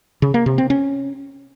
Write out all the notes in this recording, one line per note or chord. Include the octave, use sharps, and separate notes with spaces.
C#3
A#3
C3
C4
C#4